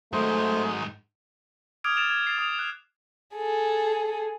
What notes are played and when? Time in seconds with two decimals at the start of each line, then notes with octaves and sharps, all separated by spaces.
0.13 G#2 D#3 F#3 G#3 A3 C5 D#5
1.84 D6 D#6 F6 G#6 D7 F7
1.97 F6 A6 D7 E7 F7
2.10 G#6
2.27 A6 C7
2.38 D#6
2.59 F#6
3.35 G#4 A4